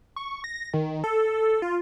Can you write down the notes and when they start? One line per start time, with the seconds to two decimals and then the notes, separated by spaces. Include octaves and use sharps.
0.16 C#6
0.44 A#6
0.74 D#3
1.04 A4
1.62 F4